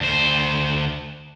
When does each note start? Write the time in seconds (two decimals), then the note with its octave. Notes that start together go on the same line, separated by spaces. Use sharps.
0.01 D2 C5